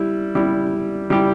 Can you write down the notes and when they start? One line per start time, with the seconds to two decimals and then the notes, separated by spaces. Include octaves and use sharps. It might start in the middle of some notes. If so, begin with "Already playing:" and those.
Already playing: G3 E4
0.35 G3 E4 G4
1.10 G3 E4 G4